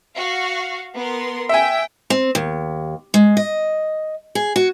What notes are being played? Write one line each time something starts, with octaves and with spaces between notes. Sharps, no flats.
F#4 F5
B3 A#4 C6
E5 G5 G#5
C4
D#2
G#3
D#5
G#4
F#4